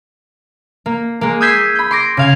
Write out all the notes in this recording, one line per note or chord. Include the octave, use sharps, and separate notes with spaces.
A#3
G#3 A#3
D#6 E6 G6 G#6 B6 C7
B5 G6
C6 D6 A#6
C#3 F5 G#6